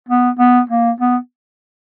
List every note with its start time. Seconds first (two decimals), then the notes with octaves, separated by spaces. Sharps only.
0.09 B3
0.39 B3
0.69 A#3
1.01 B3